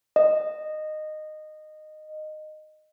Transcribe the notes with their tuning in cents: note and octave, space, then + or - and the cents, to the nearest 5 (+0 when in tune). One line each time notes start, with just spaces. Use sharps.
D#5 -15